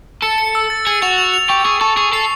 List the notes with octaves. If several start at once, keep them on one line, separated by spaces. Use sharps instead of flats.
A4 C#7
C#7
E6
A6
G#4 C#7
F#4 F7
F7
F7
G4 C#6
G#4 C#6
A4 C#6
G#4 C#6
A4 C7